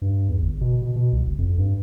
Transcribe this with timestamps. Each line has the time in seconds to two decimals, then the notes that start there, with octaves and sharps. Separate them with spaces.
0.02 G2
0.29 E2
0.42 G1
0.61 B2
0.82 B2
0.96 B2
1.12 C2
1.27 F#1
1.38 F2
1.58 G2